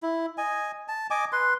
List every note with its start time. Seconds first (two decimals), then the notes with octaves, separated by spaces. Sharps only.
0.02 E4
0.38 D#5 G#5
0.88 A5
1.10 D#5 G#5 D6
1.32 B4 C6